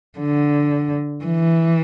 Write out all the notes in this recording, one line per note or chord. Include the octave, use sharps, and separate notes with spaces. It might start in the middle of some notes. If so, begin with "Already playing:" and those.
D3
E3